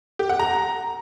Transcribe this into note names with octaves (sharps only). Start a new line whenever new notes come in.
G4
F#5
A#5